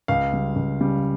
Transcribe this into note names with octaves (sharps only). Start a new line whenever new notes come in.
C#2 F5
C#3 G3
C#2
C#3 G3